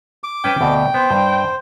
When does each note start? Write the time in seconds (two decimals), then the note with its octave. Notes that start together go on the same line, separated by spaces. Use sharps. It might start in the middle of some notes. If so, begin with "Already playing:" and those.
0.24 D6
0.44 C#4 B4 G5 A5
0.61 D2 B2
0.94 B3 C5
1.11 G2